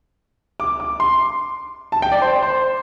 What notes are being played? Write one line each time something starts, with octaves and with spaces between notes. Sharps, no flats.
D6
D6
C6
A5
G5
D5
C5
C5